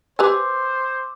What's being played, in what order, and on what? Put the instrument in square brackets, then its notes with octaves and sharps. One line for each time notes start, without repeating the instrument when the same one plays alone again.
[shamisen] G4 B4 G#5 [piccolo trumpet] C5 [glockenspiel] D6 E6